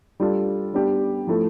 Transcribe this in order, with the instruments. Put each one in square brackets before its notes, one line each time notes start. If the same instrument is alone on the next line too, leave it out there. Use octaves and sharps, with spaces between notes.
[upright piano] G3 D4 F4 A4
G3 B3 D4 G4
F3 A3 E4 A4